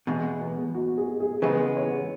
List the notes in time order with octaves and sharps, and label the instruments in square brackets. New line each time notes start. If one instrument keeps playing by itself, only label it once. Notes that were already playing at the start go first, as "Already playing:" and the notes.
[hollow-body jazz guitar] E2 B2 G#3
[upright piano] B3
F#4
G#4
G#4
[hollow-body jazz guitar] C#3 E3 G#3 B3 [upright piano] B4
[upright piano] C#5